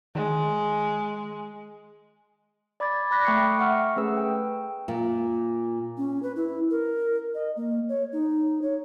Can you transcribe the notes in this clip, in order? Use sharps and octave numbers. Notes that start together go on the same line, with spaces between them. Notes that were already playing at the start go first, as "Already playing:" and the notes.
D#3 G#3
D5 B5 D6 G#6 A6
B5 D6 F#6 A#6 B6
A3 G5 C#6 F#6 C7 C#7
E5 F#5 C#6 F6
A3 C#4 G#4 B4 E6
G5
A#2
C#4
B4
E4
A#4
D#5
A#3
C#5
D#4
C#5